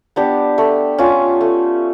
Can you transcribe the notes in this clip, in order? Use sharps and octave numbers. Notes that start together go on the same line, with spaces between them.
B3 D4 G4
A3
C#4 F4
A3